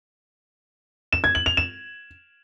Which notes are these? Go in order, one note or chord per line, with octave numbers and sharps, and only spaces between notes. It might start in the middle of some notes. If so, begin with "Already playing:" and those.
E7
G#6
F#7
F7
E7